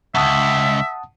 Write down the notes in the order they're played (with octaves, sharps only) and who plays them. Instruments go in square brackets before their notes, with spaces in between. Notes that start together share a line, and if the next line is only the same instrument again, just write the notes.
[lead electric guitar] C#2 F#2 [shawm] E5 [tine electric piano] F#5 A5 D#6